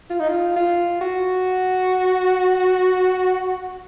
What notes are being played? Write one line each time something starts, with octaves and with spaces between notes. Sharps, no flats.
F4
D#4
F4
F4
F#4